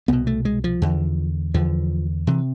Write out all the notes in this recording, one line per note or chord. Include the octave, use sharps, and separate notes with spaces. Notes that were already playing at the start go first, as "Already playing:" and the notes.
C2 B2 B3
A3
G#3
F3
E2 D3
E2 D3 F3
C3 E3